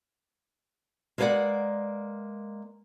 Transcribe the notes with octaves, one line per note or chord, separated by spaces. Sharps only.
G#3 A#3 B4 C5 D5 F#5